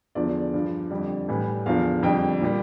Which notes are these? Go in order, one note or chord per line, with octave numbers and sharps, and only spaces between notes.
E2 D3 F3 D5
G2 F3
F2 D3 G3
A2 E3 G3
E2 D3 F3 F5
F2 D3 G3 G5
A#2 G3